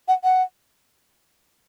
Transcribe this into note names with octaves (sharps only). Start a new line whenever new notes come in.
F#5
F#5